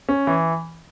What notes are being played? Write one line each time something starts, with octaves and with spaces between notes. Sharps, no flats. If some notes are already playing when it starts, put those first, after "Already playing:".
C#4
E3